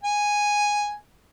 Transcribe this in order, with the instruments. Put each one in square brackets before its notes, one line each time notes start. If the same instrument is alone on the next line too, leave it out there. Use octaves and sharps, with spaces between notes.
[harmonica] G#5